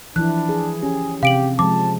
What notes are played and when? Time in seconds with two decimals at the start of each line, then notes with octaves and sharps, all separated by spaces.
0.16 E3 F3 D4 E4 F#6
0.49 G#4
0.82 C#4 G4 G#4
1.23 C3 G4 F5 D7 F#7
1.59 F3 G#3 A5 D6